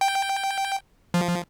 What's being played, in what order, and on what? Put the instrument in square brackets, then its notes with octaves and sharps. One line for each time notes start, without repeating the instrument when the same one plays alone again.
[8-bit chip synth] G5
F3